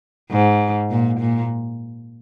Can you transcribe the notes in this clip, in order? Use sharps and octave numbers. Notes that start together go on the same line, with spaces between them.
G#2
A#2
A#2